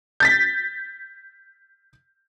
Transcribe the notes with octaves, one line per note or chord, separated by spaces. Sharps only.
G6 A6 B6